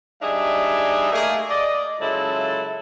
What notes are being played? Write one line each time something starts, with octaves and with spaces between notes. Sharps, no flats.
G3 D4 D#4 G#4 E5
A3 A#3 G#4
D5 D#5
C#3 F#3 G#3 E4 F4 A4